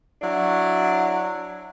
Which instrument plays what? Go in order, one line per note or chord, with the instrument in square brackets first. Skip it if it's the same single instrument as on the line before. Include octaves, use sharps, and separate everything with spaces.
[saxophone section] F#3 D4 E4